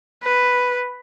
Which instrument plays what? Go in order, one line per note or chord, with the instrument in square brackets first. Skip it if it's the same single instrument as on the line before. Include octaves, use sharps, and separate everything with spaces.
[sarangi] B4